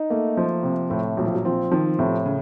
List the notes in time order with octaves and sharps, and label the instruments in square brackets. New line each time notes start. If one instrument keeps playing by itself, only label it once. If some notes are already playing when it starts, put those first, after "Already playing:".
Already playing: [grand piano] D#4
[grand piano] A3 [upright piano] A#3
[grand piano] F3
C3
[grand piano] A2 [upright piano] A3
[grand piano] A#1 [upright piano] F#3
[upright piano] F3
F#3
[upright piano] F3 [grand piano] C4
[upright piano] D#3 [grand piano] F3
[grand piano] A2 [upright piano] C3
[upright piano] C#3